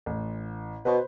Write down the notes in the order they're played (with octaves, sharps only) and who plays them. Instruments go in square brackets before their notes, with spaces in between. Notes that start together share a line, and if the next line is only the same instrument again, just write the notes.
[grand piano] A1
[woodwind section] B2 [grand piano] B4 C5